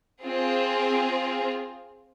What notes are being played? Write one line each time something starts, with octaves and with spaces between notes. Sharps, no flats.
C4 F4 G#4